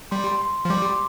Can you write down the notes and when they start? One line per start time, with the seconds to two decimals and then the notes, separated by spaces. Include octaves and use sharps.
0.11 G3 C6
0.27 C6
0.41 C6
0.65 F3
0.70 G3 D6
0.85 C6